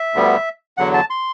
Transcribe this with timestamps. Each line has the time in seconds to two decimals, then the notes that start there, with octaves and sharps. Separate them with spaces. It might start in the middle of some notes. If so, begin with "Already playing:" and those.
Already playing: E5
0.14 D2 D3 G3 B3
0.77 E2 D3 F#3 F#5
0.94 A5
1.10 C6